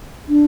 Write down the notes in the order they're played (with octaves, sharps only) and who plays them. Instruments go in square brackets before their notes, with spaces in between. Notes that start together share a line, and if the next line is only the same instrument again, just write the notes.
[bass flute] D4